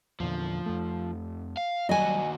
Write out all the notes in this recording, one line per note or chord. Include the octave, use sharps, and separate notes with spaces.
E2 A#2 D3 F3
F2 A3
F5
D#2 F#3 G3 F#4 D#5 G#5